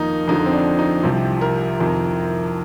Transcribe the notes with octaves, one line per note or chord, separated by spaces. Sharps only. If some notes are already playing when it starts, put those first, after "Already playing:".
Already playing: F2 D#3 A#3 D#4
F2 D3 F3 D#4
C4
D4
D#4
C2 C3 F3 G4
A#4
F2 C3 D#3